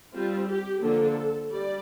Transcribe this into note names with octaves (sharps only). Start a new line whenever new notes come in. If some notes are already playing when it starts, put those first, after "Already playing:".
G3 C4 F4
G4
D3 F3 A#3 D4 A4
G3 D5